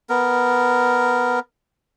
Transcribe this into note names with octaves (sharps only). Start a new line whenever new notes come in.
B3 A#4